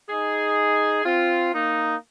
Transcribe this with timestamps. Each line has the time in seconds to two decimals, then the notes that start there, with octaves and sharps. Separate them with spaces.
0.09 D#4 G#4
1.05 C4 F4
1.52 A#3 D#4